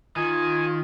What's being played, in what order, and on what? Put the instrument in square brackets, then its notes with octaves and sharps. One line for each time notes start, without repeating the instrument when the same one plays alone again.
[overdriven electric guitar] D#3 [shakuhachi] F4 [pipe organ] G#5